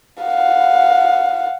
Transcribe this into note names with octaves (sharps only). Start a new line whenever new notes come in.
F5 F#5